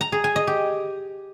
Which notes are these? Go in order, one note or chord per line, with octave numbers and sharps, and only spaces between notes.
A#5
G#4
G#5
D#5
G4